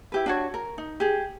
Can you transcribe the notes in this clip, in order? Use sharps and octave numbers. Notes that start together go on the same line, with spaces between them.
E4 G4 B4
D4 F#4 C#5
A#4
D#4
G4 G#4